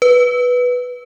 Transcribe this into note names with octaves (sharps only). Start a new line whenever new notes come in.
B4